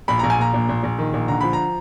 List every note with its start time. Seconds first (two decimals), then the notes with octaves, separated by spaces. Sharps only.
0.08 A#1 B5
0.19 A#1 A#5
0.30 G#5
0.38 A#2 A#5
0.54 A#1
0.69 A#1
0.83 A#1
0.98 D#3
1.13 A#1
1.28 D3 A#5
1.41 F3 B5
1.53 A#5